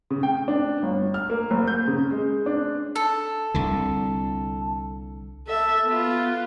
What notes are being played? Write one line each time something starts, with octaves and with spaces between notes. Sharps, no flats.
C#3
G5
D4
G1
F6
A#3
F#1
G6
C#3
G#3
D4
A4
C2 D3
A4 E5
B3 F4